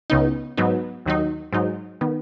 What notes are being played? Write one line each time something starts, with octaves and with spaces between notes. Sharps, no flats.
C#2 C#3 B3 D#4
G#2 F#3 B3 D#4
D#2 D#3 F#3 D#4
G#2 F#3 D#4
D#3 B3